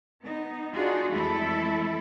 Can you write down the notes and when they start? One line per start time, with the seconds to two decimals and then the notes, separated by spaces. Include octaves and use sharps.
0.22 B3 D#4
0.72 D4 D#4 F4 F#4 G#4
1.10 F2 E3 G#3 A3 E4 A4